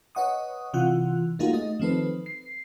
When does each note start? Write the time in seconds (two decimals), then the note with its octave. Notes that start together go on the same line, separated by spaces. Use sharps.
0.15 B4 C#5 D#5 F#5 C#6 D#6
0.73 C3 E3 F4 F#5 F#6
1.39 A3 A#3 D#4 F4 F#4 G#4
1.53 A3 D#5
1.80 D#3 F3 C4 A4 B4
2.26 C7